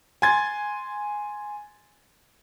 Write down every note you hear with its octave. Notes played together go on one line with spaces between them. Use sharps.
G#5 C6 G#6 A6